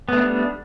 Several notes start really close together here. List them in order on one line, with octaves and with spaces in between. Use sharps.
B3 A3 D4 G3